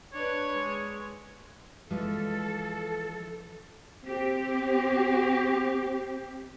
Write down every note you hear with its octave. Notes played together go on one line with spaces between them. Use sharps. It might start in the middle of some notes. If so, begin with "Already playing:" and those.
D4 B4 C#5
G#3
E3 F3 G#3 A4
C4 G4